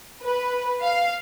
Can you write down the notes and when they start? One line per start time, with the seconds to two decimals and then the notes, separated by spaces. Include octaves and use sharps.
0.24 B4
0.82 F5